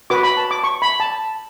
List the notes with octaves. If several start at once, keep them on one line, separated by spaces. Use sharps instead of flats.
F#4 B4 D6
B5
A5
D6
C#6
B5
A5